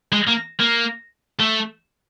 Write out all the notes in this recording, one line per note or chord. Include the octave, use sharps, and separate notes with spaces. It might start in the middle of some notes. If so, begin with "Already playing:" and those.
G#3
A#3
A#3
A3